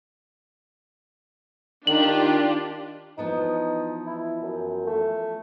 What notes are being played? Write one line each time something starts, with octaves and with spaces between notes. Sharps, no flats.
D#3 D4 F4 G4 F#7
E3 F3 B3 D#4
E4
F#2
A3